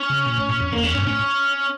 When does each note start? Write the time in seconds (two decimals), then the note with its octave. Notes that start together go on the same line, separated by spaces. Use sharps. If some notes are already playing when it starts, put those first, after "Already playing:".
Already playing: C#4
0.10 C#3
0.26 A#2
0.37 A2
0.49 A#2
0.61 F2
0.72 E2 A#3
0.83 E2 C#4
0.95 G2 C#4
1.01 A#2
1.07 A2 C#4